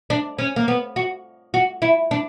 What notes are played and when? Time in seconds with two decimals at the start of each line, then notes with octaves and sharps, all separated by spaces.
0.10 D4
0.39 C#4
0.56 A#3
0.68 B3
0.96 F#4
1.54 F#4
1.82 E4
2.11 D4